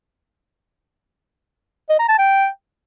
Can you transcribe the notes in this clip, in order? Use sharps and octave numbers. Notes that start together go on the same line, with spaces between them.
D#5
A#5
A5
G5